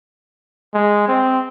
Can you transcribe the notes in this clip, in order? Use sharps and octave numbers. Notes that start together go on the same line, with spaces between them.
G#3
C4